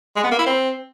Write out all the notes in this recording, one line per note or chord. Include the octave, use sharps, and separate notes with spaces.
G#3
B3
A#3
E4
C4